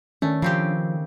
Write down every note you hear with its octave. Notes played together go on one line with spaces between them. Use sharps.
D#3 A3 C#4 D4
C#3 F3 C4 G4